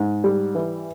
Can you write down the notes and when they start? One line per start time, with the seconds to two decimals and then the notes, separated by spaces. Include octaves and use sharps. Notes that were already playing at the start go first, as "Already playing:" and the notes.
Already playing: G#2
0.24 G3
0.55 E3